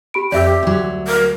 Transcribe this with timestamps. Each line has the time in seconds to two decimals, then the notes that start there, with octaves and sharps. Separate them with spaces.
0.14 G4 B5 D7
0.32 F2 G4 D5 E5 E6
0.63 D2 F#3
1.07 A#4